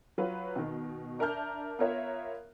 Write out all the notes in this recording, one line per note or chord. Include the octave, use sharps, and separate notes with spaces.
F#3 F4 B4
B2 D#3
D4 A#4 E5 A5 F6 G6
B3 F4 A#4 C#5 E5